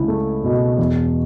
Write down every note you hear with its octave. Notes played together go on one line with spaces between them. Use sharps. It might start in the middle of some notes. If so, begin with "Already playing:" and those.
Already playing: C#2 E4
A3
B2
E2